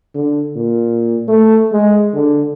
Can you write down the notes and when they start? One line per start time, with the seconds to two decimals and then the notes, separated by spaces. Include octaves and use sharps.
0.14 D3
0.56 A#2
1.28 A3
1.72 G#3
2.13 D3